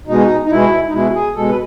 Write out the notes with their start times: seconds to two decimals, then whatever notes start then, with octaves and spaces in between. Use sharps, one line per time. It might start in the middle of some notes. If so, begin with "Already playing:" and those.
0.07 B2 G#3 D#4
0.45 D#4
0.50 B2 G#3 E4
0.88 D#4
0.92 B2 G#3 E4
1.14 G#4
1.36 B2 G#3 A4
1.49 B4